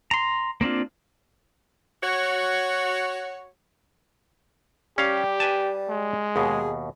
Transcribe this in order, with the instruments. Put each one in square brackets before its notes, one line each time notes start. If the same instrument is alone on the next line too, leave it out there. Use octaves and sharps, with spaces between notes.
[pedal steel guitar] A#5 C6
A#3 C4 D4 F4
[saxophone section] F#4 C#5
[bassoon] G3 [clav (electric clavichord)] C#4 F5 [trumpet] G4
[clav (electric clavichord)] B4 G#5 A5
[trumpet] G#3
[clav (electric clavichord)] D#2 B2 [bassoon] G#4